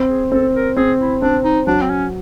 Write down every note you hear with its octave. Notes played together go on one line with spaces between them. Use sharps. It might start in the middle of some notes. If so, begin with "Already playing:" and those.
Already playing: C4
G#4
C4 A4
A#4
C4 G#4
E4
C4 D4
D#4
F#3 D4
C4
C#4